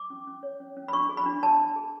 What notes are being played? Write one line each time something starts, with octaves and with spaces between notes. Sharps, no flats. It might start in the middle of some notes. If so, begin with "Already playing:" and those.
Already playing: D6
C#4
C#4
C#5
C#4
C#4
B5
D4 C#6
G#4
B5
D4
D4 A5
D4
G#4